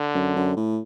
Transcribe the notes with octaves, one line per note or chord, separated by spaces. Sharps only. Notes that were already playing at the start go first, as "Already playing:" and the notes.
Already playing: D3
F#2
F#2
A2